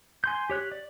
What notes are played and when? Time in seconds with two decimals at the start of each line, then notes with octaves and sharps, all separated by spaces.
0.24 G#5 C6 G6
0.50 G4 C#5 F#6
0.72 D5